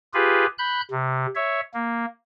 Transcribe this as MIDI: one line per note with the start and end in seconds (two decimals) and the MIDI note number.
0.14 0.46 65
0.14 0.46 67
0.14 0.46 68
0.14 0.46 71
0.58 0.81 83
0.58 0.81 90
0.58 0.81 91
0.91 1.26 48
1.35 1.61 73
1.35 1.61 76
1.74 2.05 58